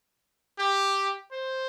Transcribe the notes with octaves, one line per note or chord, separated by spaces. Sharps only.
G4
C5